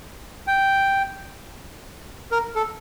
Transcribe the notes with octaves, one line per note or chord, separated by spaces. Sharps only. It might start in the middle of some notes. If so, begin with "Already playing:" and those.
G5
A#4
A4